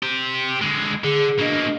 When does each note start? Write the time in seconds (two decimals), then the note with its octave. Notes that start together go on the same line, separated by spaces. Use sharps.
0.03 G4 C5
0.61 D3 G#3
1.04 D3 G#4
1.39 B2 A#3 D4 D#5